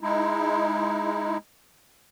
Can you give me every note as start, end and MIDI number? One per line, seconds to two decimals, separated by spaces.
0.01 1.37 56
0.01 1.37 63
0.01 1.37 64